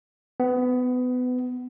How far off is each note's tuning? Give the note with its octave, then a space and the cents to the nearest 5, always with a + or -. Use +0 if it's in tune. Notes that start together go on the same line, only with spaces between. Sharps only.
B3 +25